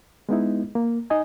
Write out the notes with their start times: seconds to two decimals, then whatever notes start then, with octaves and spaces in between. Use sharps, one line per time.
0.29 G#3 B3 D#4 E4
0.75 A#3
1.10 D#4 D#5 G#5